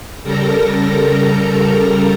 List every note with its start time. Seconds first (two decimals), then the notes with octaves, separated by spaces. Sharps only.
0.23 C#3 G3 A4 A#4 A#5